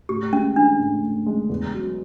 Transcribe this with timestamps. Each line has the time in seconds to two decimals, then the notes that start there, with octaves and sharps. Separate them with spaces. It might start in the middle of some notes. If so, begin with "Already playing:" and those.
0.09 A2 G4
0.33 G#3 C#4
0.56 E3 D4
0.79 A2
1.03 A2
1.26 G#3
1.49 E2
1.73 F#3